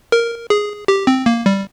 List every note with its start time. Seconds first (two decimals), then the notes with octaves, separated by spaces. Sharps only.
0.12 A#4
0.50 G#4
0.88 G4
1.07 C4
1.26 A#3
1.46 G3